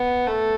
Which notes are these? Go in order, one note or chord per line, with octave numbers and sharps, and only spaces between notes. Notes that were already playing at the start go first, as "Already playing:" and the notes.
Already playing: B3
A3